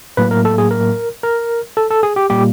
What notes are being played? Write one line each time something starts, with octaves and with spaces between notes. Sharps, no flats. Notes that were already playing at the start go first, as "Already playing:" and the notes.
A2 F#3 A#3 B4
A#4
A4
G#4
A#4
A#4
A4
A4
G#4
G4
A#2 G3 A#3 G4